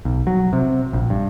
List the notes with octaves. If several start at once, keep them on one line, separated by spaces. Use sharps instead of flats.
B1
F#3
C3
A#1
G2